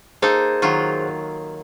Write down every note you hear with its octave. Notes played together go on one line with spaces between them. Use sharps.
A#3 D#4 G#4 A4 C5
D#3 F#3 F4